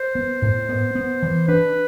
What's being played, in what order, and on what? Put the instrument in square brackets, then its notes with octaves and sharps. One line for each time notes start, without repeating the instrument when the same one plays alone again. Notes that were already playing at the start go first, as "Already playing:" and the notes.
Already playing: [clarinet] C5
[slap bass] B3
A2
B3
B3
E3
[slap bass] D4 [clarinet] B4